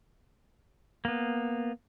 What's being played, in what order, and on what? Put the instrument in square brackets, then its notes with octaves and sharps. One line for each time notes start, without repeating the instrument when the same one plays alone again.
[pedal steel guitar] A#3 B3